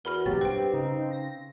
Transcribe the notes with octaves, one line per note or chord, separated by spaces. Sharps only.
E2 F#4 A#4 B5 F6
B1 E2 A2 F#3 G4 A6
G2 C4 B4 G5
C#3 D#4
A#6